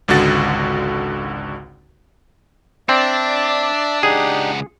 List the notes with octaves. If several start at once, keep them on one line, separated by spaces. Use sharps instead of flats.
G#1 C#2 D3 F#4 A6
C4 D4 D5 E5
C#2 D4 D#4 G4 G#4 F#5